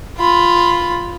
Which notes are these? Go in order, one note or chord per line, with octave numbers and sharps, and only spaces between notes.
F4 B5